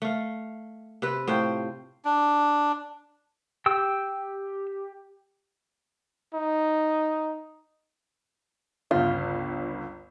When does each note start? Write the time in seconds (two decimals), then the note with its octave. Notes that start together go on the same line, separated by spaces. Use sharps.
0.02 A3 F5
1.02 C3 B4
1.28 A2 F4 C5 G5
2.05 D4
3.66 G4 G5 E6
6.34 D#4
8.91 G1 C#2 F4